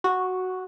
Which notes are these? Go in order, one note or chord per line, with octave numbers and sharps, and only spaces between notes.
F#4